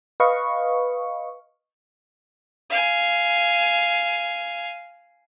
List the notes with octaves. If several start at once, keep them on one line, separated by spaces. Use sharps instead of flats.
B4 D#5 F5 C#6
F5 G#5